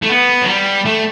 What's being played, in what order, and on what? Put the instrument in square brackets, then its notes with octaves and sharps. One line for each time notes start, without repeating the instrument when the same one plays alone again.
[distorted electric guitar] A3
B3
F#3
G3
A3